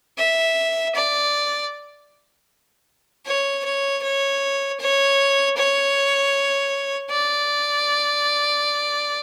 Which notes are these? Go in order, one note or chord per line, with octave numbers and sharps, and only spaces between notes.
E5
D5
C#5
C#5
C#5
C#5
C#5
D5